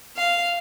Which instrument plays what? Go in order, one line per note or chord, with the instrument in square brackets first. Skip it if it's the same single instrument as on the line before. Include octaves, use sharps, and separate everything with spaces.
[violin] F5